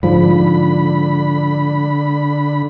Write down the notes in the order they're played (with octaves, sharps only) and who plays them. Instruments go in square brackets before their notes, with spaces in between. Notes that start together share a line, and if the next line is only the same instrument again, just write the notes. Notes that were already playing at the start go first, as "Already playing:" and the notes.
[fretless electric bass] G#2 F3 [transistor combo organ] D3 B5